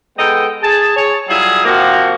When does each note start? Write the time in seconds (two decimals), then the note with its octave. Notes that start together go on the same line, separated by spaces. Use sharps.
0.17 G#3 B3 A4 D#5 G5
0.62 G#4 A5
0.94 G#4 C#5
1.27 F#3 G3 E4 F4 G#4
1.64 C3 F3 A#3 F#4